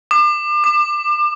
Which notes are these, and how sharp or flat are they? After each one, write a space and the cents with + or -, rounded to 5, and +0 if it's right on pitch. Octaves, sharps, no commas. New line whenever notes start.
D6 +35
D6 +25